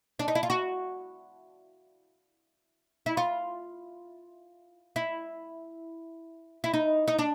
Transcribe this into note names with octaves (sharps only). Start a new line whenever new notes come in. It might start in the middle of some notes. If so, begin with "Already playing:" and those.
D4
D#4
E4
F4
F#4
E4
F4
E4
E4
D#4
D#4
D4